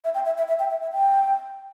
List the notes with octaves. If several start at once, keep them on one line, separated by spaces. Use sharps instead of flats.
E5
G5
E5
E5
E5
G5
E5
E5
G5